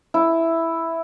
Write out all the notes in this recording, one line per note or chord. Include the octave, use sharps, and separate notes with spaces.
E4